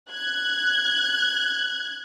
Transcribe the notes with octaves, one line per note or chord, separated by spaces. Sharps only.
F#6 G#6